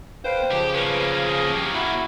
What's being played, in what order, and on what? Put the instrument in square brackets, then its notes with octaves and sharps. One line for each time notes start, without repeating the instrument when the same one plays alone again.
[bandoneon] B4 F5 G5 [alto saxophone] C5
[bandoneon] C#3 F3 [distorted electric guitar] G4
[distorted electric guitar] A#3 C#4 [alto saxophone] B4
[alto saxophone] G#4
G4
[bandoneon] E4 [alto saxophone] F#4